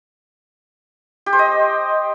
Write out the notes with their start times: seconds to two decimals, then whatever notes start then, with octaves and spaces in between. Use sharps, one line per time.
1.26 G4
1.33 C5
1.39 D#5